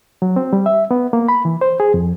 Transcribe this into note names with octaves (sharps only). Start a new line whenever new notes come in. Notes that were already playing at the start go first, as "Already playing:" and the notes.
F#3
C4
G3
E5
B3
A#3
B5
E3
C5
G#4
F2